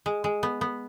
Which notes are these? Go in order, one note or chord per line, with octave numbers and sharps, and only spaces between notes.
G#3
G#3
B3
B3